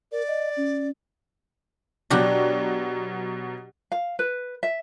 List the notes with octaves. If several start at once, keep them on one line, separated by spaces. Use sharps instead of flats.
A#4 D5
D#5
C#4
B2 F#3 D4 F#4 G4
F5
B4
E5